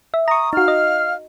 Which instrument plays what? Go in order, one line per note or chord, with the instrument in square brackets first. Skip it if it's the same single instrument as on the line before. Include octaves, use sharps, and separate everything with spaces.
[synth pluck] E5
[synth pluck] A#5 C#6 [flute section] D#6
[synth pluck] D#4 F#4 [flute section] F5 F6
[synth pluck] D#5